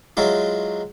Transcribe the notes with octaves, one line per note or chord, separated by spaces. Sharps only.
F#3 G#3 E4 F4